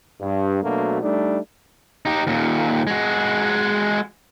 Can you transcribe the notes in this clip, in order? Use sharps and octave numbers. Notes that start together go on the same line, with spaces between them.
G2
B2 F#3 A3 A#3 D4
G3 A3 D4 D#4
D#4 G4
D#2 A#2
G#3 F#4